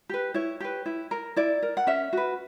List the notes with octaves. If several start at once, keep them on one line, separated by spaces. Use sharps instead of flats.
G4 B4
E4 C#5
G4 B4
E4
A#4
E4 D5
A#4
F#5
C#4 E5
F#4 B4